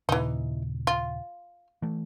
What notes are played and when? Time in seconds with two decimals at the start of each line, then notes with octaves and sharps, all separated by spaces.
0.09 D#2 A#2 C#3 E3 D#4
0.87 F4
1.82 E3 A3